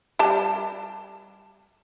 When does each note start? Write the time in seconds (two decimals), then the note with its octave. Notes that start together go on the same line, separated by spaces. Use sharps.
0.19 G3 G4 A5